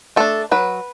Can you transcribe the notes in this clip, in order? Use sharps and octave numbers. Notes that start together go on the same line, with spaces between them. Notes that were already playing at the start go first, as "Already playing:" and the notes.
A3 D4 A4
F#3 B4